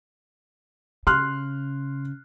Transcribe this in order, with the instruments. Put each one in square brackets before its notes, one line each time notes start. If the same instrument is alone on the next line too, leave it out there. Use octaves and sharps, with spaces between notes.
[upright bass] C#3 [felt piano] C6 F6 F#6